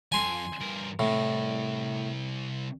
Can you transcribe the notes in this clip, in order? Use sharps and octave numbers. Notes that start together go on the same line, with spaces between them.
F2 F3 G#5 C6
G2 A#4
C2 A2